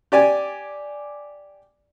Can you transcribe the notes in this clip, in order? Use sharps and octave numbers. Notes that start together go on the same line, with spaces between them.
G4 D5 G#5